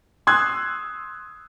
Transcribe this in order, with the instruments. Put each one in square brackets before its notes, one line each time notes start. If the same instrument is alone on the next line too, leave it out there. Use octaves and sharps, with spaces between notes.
[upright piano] C6 D#6 E6 F#6 G#6